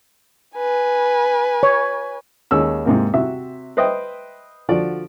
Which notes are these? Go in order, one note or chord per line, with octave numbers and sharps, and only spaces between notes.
B4 G#5
C#5
D#2 G#3 C#4 E6
G#2 C3 A#3
C3 F#4 E5
B4 C5 D#5 E5 G5
D3 F3 F#4 D5